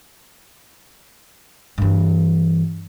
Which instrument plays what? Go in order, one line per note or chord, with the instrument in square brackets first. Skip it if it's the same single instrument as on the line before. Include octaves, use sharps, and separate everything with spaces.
[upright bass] G2 E3